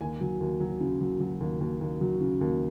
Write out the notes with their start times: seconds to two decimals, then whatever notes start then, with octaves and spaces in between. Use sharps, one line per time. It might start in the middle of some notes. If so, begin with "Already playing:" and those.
0.01 D#2 G#5
0.21 F#3
0.40 D#2
0.60 F#3
0.81 C#3
1.01 F#3
1.20 F#3
1.40 D#2
1.61 D#2
1.81 D#2
2.01 F#3
2.21 C#3
2.41 D#2